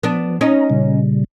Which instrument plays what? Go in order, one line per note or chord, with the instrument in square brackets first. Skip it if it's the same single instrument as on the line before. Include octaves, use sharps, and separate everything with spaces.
[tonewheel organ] F3 [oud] B3 D4
[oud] C#4 D#4 [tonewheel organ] A#5
[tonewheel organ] A#2 C#3 G3